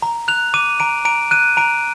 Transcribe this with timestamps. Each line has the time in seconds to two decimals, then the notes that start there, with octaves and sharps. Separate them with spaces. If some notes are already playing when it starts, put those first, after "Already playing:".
0.02 A#5
0.28 F#6 F7
0.54 D6 D#7
0.80 A#5 D7
1.05 A#5 D7
1.31 F#6 D#7
1.57 A#5 D7